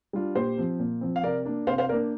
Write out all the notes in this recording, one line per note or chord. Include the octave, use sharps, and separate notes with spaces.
G3 D4 F4
A#2 G4 C5
F3 C4
A#2
F3 C4
F5
C3 A#4 D5
A#3 D4
C3 C5 F5
C5 F5
A#3 D4 A#4 D5